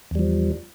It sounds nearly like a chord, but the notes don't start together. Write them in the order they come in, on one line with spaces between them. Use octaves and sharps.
E2 G3 F3